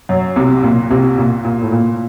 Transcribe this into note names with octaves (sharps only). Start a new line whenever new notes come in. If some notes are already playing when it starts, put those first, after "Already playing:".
F#2 F#3
C2 C3
A#2
C2 C3
A#2
A#2
A2
A#2